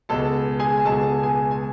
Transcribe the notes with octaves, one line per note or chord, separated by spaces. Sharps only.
C#2 B2 G#3 A4 A5
G#4 G#5
G#5
C#2 B2 G#3 A4 A5
G#4 G#5
G#5